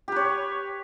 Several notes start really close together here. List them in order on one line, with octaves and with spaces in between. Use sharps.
G4 B4 C#5